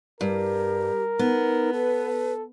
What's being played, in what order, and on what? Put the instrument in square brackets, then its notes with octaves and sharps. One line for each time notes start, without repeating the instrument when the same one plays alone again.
[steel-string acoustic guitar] G2 [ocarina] G4 [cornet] A#4
[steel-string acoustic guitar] B3 [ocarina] D#4
[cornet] A4 [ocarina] B4